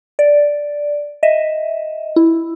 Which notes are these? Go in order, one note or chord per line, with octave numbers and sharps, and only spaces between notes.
D5
D#5 E5
E4